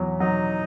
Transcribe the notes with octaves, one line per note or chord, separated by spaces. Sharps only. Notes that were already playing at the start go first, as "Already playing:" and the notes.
Already playing: E2 F#3
F#3 D#4 D#5